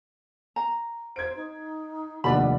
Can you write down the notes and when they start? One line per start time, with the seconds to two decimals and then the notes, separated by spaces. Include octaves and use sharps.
0.56 A#5
1.16 C5 G#6 D7
1.36 D#4
2.24 F1 D#2 D4 D5 F#5 B5